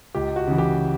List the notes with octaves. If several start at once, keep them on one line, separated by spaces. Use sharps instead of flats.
C#2 G4
F#4
C#3 E3
G4